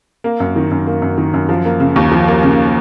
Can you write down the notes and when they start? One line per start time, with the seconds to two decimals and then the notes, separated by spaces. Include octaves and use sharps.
0.24 A#3
0.40 F#2
0.56 D#3
0.71 F#2
0.87 A#3
1.02 F#2
1.18 D#3
1.34 F#2
1.49 F3
1.65 A#3
1.80 C#3
1.96 D#2
2.12 F3
2.28 A#3
2.43 C#3